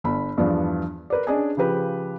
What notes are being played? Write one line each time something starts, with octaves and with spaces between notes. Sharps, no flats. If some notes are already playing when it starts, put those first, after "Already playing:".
G1 B5
E2 G2 E3 F3 B3 D4
A#4 B4 D5
C#4 D4 G#4 D5 D#5 G#5
C#3 F3 G4 B4